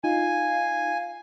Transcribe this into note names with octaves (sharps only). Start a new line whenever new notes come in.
D#4 F4 F5 G#5